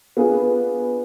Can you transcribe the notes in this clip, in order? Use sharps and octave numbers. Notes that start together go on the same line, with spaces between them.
B3 D4 F4 G#4 B4